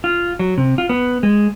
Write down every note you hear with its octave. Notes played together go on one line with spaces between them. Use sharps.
F4
F#3
C3
F4
B3
G#3